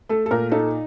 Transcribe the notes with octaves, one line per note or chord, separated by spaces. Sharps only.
A3 A4
A4
A#2 A#4
D#4 A4